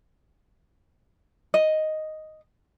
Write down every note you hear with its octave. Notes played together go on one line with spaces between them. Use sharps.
D#5